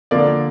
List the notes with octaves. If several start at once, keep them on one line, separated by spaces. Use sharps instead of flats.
D3 F3 A#3 D5